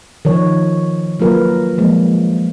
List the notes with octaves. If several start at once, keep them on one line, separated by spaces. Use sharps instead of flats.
D#3 F3 C#5
F#3 A#3 F4 A#4 B4
F3 G#3 A#3